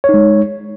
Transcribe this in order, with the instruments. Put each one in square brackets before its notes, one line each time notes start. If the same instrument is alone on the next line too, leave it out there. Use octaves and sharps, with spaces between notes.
[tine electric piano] C#5
D#4
G#3